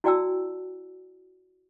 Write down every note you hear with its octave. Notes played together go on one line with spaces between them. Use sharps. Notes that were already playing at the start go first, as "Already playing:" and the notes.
E4 F#4 D5 G5 A5 E6